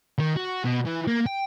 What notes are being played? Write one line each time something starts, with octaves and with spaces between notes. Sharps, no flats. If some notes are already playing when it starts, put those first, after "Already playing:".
D#3
F#4
B2
E3
A#3
G5